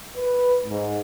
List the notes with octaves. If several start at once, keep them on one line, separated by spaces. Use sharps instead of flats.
B4
G#2